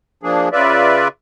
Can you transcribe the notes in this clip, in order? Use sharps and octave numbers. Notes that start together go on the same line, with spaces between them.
F3 A#3 D4 G#4
C#3 F4 B4 D5 E5